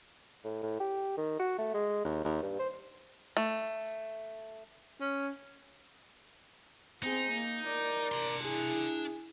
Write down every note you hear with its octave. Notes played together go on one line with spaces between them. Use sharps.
A2
A2
G4
D#3
F#4
A3
G#3
D#2
D#2
G2
C5
A3
C#4
C4 D#4 G#4
A#3
A#4 D5
D4 C6
E4 G#4